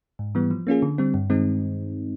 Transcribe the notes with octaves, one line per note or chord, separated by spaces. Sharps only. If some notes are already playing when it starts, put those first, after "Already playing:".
G#2
E3 G3 B3
F3
A#3 C#4 F4 G#4
D3
G3 C4
G2
D#3 G#3 C4 D#4